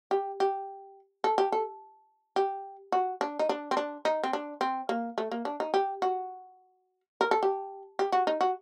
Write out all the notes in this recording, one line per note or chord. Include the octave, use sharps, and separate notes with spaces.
G4
G4
A4
G4
A4
G4
F#4
D4
D#4
D4
C4
D4
D#4
C4
D4
C4
A#3
A3
A#3
D4
D#4
G4
F#4
A#4
A4
G4
G4
F#4
D#4
F#4